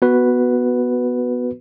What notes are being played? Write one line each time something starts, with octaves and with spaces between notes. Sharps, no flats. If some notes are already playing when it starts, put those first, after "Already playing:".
B3 F#4 B4